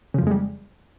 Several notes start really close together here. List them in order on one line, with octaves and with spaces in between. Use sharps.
C#3 F3 F2 G#3 G3